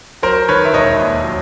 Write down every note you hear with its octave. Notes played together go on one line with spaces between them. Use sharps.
F#3 A#4 C5
D#3 B4 C#5
E5
E1 C#5 D#5
D#2
F#3